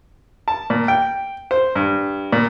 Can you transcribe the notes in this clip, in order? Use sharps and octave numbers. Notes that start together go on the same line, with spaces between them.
A5
A#2
G5
C5
G2
A#2